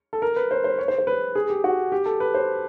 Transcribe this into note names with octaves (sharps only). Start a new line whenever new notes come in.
A4
A#4
B4
C5
C5
C#5
C5
C5
B4
G#4
G4
F#4
G4
A4
B4
C5